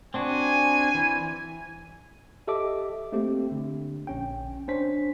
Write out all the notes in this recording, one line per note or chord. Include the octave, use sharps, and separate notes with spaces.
C4 D4 F#4 G#5
E3
G4 A4 D#5 E5 D6
A3 A#3 C4 G4
D3
A#1 C#4 G5
C#4 D4 C5 B6